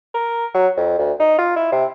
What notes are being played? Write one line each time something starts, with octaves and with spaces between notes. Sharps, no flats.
A#4
F#3
F2
D2
D#4
F4
E4
C3